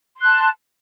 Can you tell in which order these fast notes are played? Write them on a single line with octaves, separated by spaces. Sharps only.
C6 F#6 A5